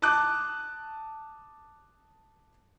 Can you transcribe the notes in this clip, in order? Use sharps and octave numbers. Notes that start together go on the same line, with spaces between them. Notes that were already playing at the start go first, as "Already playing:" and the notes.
A5 D6 D#6 F#6